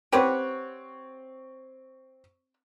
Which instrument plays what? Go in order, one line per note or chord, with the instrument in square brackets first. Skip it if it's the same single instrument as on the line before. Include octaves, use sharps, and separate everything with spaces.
[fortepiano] C4 C#5 [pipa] G4 B4 F#5